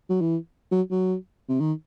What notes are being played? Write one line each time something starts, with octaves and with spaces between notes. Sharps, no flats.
F#3
E3
F#3
F#3
C3
D#3